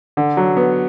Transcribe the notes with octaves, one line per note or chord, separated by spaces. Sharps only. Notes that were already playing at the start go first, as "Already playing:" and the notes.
D3
F#3
B3